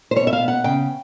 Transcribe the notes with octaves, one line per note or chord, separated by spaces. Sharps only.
C5
B2 C#5
E5
F5
B3
F#5
C#3 G5